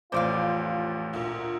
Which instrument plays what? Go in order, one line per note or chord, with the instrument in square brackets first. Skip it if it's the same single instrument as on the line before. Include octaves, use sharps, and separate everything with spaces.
[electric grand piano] A1 D6 [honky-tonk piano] F2 [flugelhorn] F4 [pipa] C5 D5 F5
[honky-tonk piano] D2 A#2